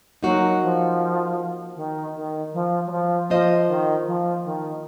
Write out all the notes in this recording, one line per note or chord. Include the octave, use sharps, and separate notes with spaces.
F#3 A#3 D#4 F#4
F3
D#3
D#3
F3
F#3
F3
F3 A#3 F4 C5 D#5
D#3
F3
D#3